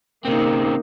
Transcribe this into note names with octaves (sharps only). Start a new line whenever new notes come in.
C#3 A#3 C4 D#4